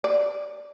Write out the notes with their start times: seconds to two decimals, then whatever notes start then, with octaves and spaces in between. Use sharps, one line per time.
0.04 D5